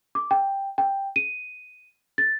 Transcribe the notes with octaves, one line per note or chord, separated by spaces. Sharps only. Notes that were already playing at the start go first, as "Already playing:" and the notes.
D6
G5
G5
D#7
A6